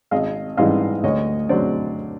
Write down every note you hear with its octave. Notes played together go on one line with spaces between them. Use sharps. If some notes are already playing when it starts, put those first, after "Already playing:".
G#1 D#5 F5
G#2 E3 G3 D#5 F5
D2 C#5 D#5
D3 F#3 C5 D5